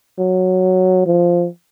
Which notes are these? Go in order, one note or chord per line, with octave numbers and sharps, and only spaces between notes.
F#3
F3